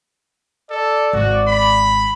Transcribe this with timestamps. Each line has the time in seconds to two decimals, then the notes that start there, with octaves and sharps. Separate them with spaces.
0.71 A4 D5
1.13 G#1 F#4
1.48 B5